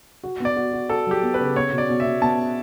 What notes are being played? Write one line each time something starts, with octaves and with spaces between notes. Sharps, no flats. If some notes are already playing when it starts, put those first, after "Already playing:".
F#4
B3 D5
F#4
F#4
F#4 A4
F#3 G4
B3
B4
C#3
B3 C#5
B2
D5
B2
E5
B2
B3 A5